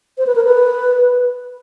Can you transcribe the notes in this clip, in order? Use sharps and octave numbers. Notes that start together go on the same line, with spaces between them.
C5
B4
A#4
B4